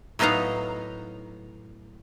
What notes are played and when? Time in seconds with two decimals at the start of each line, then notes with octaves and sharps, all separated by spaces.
0.19 A2 F#3 B3 D#4 F5 A#5